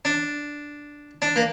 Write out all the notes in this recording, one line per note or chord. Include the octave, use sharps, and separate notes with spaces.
D4
D4
A#3